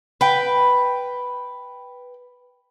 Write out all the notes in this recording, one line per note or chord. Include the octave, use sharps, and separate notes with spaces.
B4 G5